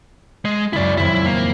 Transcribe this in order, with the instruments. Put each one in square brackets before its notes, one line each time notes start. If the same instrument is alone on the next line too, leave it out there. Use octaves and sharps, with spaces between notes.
[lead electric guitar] G#3
[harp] C#2 F#2 [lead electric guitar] E4 D5
[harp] D#1 F2 [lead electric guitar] E4
[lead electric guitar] A#3